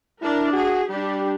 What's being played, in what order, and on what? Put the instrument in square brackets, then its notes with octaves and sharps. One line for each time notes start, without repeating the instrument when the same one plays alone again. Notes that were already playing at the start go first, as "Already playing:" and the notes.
[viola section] D4 A#4 [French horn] E4
[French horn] F#4 [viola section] G#4
[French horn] G3 [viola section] D4 G4